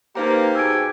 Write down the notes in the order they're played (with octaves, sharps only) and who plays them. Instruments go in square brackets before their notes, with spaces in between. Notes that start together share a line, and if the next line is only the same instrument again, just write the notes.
[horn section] A#3 [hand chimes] D#4 C5 A#5 [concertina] G4 [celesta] B4 G5
[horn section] B2 G#4 G#5 [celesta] E6 G#6 D7